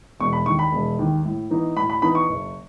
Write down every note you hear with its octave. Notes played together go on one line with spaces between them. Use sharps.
E1 C#6
B5
D#2 D#3 C#6
B5
E1
D#2 D#3
A2
E3 B3 D#4
A2 B5
B5
E3 B3 D#4 B5
C#6
F#1